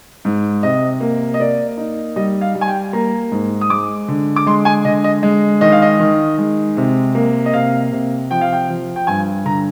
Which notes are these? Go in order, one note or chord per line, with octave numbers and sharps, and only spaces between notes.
G#2
C3 D#5
A#3
D#5
A#3 D5
D#4
G3 D#5
F5
G3
G#5
G5
A#3 A#5
G#2
D#6
G#3 D6
D3
D6
G#3 C6
G#5
D3 D#5
D#5
G#3
D#3 D#5
F5
D#5
D#3
G#3
C3
A#3
D#5
C3 F5
C3
F3 G5
F5
G5
F3
G5
G2 G#5
D3 A#5